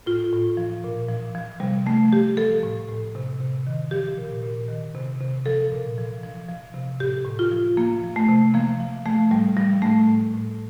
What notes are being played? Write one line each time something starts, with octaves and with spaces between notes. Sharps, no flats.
A2 F4
A2
F3
A#2
F3
F3
C3 G3
F3 A3
F3 G4
F3 A4
A2
A2
C3
C3
D#3
F3 G4
A#2
A#2
D#3
C3
C3
F3 A4
A#2
F3
F3
F3
C3
A2 G4
A2
F4
F3
F3 A#3
F3
A3
C3
F3 A#3
F3
F3 A3
A2 G3
F3 G3
A2 A3
A2
A2